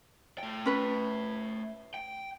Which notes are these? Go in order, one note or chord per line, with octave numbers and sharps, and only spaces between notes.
A3 G5
C#4 B4 B5
G5